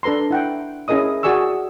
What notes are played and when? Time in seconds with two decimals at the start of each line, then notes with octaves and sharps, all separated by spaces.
0.03 D4 A4 B4 A#5 C6
0.31 E4 F#5 G5
0.88 C#4 E4 G#4 A#4 D#5 D#6
1.23 F#4 G#4 D5 G#5 C#6 E6